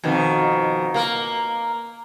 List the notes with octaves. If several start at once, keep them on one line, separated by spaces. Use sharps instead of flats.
F2 B2 D#3
A#3 A#4